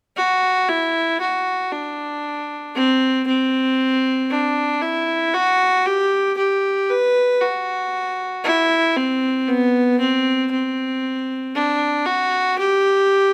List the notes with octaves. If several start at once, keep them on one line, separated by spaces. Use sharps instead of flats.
F#4
E4
F#4
D4
C4
C4
D4
E4
F#4
G4
G4
B4
F#4
E4
C4
B3
C4
C4
D4
F#4
G4